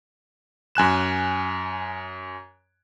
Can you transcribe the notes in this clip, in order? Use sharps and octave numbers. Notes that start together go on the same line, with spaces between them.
F#2 G#5 F#6 E7